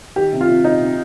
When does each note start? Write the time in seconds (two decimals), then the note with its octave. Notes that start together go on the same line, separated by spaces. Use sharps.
0.16 D#3 G4
0.33 C3
0.41 F4
0.49 C3
0.64 C3 D#4
0.80 C3